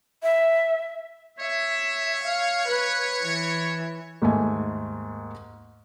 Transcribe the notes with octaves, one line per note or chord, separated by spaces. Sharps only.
E5
C#5 E5
F5
B4
E3
D#2 G#2 A3 G#5